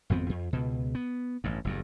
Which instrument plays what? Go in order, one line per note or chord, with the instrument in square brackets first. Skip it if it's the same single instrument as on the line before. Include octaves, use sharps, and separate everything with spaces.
[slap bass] G#1 F2 B3 C4
F2
C#2 B2
B3
A1 G2
F#1 E2 G2